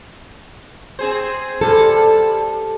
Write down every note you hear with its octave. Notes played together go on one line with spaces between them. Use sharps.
C4 G#4 C5
G3 A4